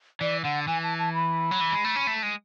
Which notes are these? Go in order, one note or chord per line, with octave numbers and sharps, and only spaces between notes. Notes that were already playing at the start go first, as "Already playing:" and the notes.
E3 D5
D3 F#5
E3 G#5
A5
A5
B5
F#3
E3
G#3
A3
C#4
A3
G#3